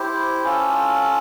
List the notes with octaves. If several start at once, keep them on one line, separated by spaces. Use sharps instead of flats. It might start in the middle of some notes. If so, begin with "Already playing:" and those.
Already playing: E4 G4 C5
C#4 F4 A4